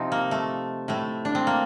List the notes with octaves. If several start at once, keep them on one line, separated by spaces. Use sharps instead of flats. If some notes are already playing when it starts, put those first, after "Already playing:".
Already playing: C3 F3 C4 D#4
A#3
A3
A2 A3
D4
C4
A#3